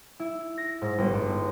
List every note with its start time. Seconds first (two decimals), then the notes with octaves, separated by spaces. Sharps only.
0.20 E4
0.57 A#6
0.82 G#2
0.98 G1
1.14 G1